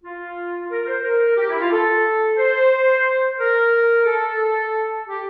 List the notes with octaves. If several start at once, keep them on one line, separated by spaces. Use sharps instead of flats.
F4
A#4
C5
A#4
G4
E4
F4
A4
C5
A#4
A4
G4